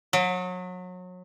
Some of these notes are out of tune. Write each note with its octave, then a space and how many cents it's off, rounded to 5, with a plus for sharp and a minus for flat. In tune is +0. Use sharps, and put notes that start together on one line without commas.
F#3 -30